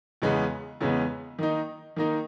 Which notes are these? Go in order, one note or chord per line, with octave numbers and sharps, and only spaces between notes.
E2 C#3 G#3 B3
E2 C#3 G#3 B3
D#3 A#3 D#4
D#3 A#3 D#4